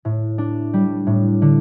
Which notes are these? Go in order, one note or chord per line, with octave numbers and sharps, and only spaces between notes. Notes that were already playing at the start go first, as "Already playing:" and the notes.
A2
D4
G3
A2
D3